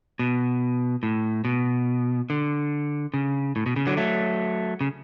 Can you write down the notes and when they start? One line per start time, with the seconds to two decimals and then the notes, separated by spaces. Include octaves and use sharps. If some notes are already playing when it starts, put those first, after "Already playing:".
0.19 B2
1.03 A2
1.45 B2
2.30 D3
3.14 C#3
3.56 A2
3.66 B2
3.76 C#3
3.87 D3 F#3
3.97 F#3 A3
4.81 C#3